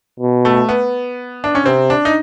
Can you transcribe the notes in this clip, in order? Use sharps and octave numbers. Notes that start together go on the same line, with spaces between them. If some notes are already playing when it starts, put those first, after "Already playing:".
B2
A3
B3
D4
C#4
C3 C4
D4
D#4